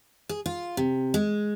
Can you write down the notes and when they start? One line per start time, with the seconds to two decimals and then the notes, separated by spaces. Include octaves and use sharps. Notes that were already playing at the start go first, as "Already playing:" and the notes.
0.29 G#4
0.46 F4
0.77 C3
1.14 G#3